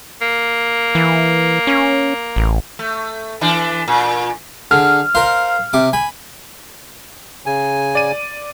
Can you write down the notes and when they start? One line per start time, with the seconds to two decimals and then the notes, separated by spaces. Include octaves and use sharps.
0.21 A#3
0.95 E3
1.67 C#4
2.36 A1
2.79 A3
3.41 E3 D4
3.88 A#2
4.71 D3 G#4 F6
5.15 A#4 C5 F5
5.73 C3 D6
5.93 G#5 B5
7.46 C#3 G#5
7.95 D5 D#7